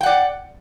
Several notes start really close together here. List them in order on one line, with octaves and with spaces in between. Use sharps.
G5 F#5 D5